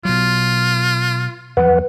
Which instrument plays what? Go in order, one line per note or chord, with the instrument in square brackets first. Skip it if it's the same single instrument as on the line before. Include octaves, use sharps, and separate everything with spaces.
[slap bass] B2 F#3 [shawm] F4
[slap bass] E2 F3 F#3 [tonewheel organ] B4 F#5